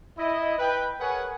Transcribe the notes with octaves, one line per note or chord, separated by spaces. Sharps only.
E4 D#5
B4 G5
G#4 A#4 B4 C#5 F#5 G#5